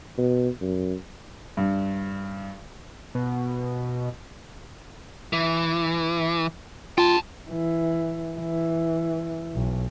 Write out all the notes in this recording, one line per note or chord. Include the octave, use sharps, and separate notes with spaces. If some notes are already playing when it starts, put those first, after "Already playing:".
B2
F#2
G2
B2
E3
F4 G5 A5
E3
E3
B1